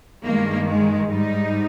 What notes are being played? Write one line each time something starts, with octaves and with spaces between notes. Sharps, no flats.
G2 D#3 G#3 A#3
G#3
G#2 G3 D#4